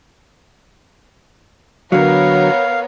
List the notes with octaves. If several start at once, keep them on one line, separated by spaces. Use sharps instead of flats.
D3 F#3 B3 A#4 C#5 F5